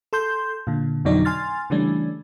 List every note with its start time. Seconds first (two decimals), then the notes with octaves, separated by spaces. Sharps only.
0.13 A4 C6 G6
0.67 A#2 D3
1.05 F2 B2 D3 F#3 D#4 D5
1.25 G#5 C6 F6 A6
1.70 C#3 E3 G3 A3 C#4 D4